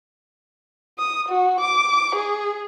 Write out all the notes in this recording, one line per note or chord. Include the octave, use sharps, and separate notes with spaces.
D#6
F#4
D6
G#4